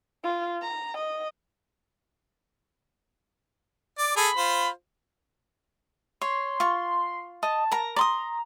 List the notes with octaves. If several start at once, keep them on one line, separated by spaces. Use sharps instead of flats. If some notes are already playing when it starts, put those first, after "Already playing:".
F4
A#5
D#5
D5 D6
G#4 A4 B5
F4 C5
C#5 C6
F4 C#6
D#5 A5
A#4 A#5
D5 A#5 C6 D#6